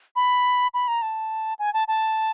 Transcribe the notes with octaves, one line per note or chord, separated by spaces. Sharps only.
B5
B5
A#5
A5
G#5
A5
A5